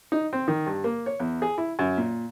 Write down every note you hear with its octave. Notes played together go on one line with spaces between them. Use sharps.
D#4
C4
D#3
G2
A#3
C#5
E2
G#4
E4
F#2
A#2